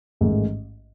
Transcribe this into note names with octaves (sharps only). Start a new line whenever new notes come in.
A1 G#2 D#3 A3